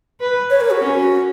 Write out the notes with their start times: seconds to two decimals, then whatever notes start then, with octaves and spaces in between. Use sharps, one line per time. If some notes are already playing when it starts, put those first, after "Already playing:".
0.20 B4
0.50 C#5
0.61 A#4
0.71 F#4
0.81 C#4